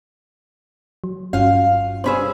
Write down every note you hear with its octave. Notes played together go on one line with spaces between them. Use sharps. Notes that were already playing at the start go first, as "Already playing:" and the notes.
F#3
G1 G2 C#4 F4 F#4 F5
G2 C#4 G#4 C5 B5 E6